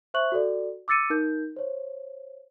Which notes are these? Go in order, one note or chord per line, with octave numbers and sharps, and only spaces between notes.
C5 E5 C#6 F#6 F#7
F#4 A4 D5
D6 E6 A6 C#7 D#7
D#4 A#4 G6
C5 C#5